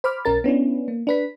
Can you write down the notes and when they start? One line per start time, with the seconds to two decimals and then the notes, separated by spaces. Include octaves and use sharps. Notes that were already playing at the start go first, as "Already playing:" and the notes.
0.04 C5 B5 D6 F6
0.25 B1 C#4 A#4 A6
0.44 B3 C#4 D4 E4
0.88 A#3
1.07 D4 B4 B6